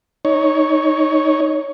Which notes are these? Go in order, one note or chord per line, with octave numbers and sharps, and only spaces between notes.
D#4 C#5